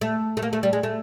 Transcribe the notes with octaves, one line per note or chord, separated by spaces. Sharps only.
A3
A3
A#3
A3
G3
G#3
A3